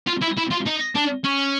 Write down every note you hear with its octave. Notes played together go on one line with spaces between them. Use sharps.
F4
E4
E4
F4
D#4
D4
C#4